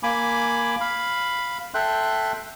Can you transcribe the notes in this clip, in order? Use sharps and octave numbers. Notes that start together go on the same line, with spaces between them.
A#3 G#5 B5 D6
F5 B5
A4 E5 G5 C6 F#6